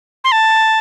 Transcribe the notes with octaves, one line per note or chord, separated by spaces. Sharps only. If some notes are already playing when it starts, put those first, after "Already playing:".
C6
A5